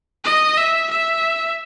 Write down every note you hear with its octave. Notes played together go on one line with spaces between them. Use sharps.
D#5
E5
E5